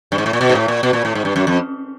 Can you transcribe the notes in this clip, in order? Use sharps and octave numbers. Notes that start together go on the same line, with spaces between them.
G2
G#2
A2
A#2
B2
G#2
A2
A#2
B2
A#2
A2
G#2
G2
F#2
F2